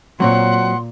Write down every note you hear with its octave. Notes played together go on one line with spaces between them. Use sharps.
A#2 F#3 C4 C#5 F#5 C6